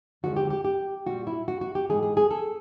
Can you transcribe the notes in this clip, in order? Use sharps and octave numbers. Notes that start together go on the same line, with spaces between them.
D#2 D3 F3 G#3 F#4
G4
G4
G4
A#2 G3 F#4
E4
F#4
F#4
G4
G#2 E3 G#3 G#4
G#4
G#4
A4